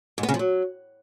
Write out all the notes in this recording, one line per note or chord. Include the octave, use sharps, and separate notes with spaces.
G#2
B3
C#3
F3
F#3